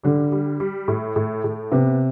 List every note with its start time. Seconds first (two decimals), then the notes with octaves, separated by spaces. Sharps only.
0.03 D3 G3
0.32 G3
0.60 G3
0.88 A2
1.16 A2
1.44 A2
1.71 C3 B3